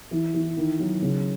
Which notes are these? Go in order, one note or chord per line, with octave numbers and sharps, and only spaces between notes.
E3
E3
D#3
F#3
C#3